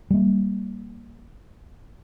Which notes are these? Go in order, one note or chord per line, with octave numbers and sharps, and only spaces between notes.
G3 A#3